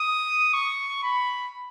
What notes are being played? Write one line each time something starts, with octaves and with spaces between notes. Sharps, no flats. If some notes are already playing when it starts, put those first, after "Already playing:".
Already playing: D#6
C#6
B5